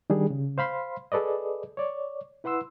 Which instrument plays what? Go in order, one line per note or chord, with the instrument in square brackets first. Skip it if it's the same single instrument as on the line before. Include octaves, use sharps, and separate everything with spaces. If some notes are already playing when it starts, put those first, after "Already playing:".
[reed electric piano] D#3 G3 D4 G#4
C#3
C5 F5 B5 C6
G#4 A4 B4 D5 D#5
C#5 D5
E4 B4 F#5 C6 E6